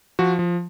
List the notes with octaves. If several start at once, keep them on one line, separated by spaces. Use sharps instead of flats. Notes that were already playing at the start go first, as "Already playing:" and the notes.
F3 F#4
F3